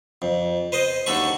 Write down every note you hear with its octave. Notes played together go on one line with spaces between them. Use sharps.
F2
B4 C5 D#5
D#2 D3 F#4 A4 B5 C#6